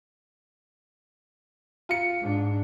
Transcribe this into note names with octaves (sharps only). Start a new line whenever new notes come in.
F4 C#7
G#2 D4